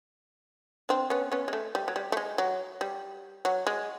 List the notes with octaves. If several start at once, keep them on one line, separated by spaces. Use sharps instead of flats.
C4 D4
B3 C#4
B3 C#4
G#3
A3
G3
F#3
G3
A3
G#3
F#3
G3
F#3
G#3